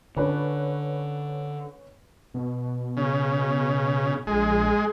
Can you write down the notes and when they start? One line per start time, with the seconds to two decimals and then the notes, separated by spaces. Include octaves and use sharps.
0.17 D3 C#4 B4
2.34 B2
2.97 C#3
4.27 A#1 G#3